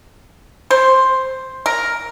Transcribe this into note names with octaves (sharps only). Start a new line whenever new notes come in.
C5
A#4